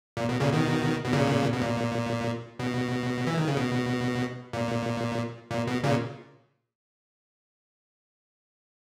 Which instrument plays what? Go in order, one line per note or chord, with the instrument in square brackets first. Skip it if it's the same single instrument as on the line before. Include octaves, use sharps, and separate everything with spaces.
[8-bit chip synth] A#2
B2
A#2 C#3
B2 D#3
B2
A#2 C#3
B2
A#2
B2
E3
D#3
C#3
B2
A#2
A#2
B2
A#2 C#3